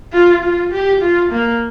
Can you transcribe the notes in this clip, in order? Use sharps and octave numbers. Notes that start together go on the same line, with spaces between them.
F4
F4
G4
F4
A#3